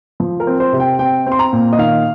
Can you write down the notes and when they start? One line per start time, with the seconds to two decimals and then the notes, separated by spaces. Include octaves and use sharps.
0.20 F3
0.40 A#4
0.47 C4
0.60 C5
0.73 C3
0.80 G5
0.99 C4 G5
1.26 C4
1.32 C6
1.39 A#5
1.53 A#2
1.73 D#5
1.78 D#3 F5